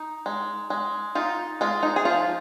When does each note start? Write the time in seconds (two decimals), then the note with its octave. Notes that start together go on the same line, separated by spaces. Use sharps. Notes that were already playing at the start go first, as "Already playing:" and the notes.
Already playing: D#4
0.26 G#3
0.70 G#3
1.15 D#4 F4
1.61 G#3 F4
1.83 D#4
1.96 G#4
2.05 F3 F4